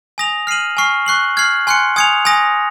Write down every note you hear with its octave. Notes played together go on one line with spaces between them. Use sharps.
G#5 D#6 A#6 F7
F6 C7 D#7 F#7
G#5 C#6 F6 C7
C#6 F#6 C7 F#7
F6 G#6 C7 F#7
G#5 C6 F#6 C#7
G#5 D#6 G#6 C#7 F7
G#5 D#6 A#6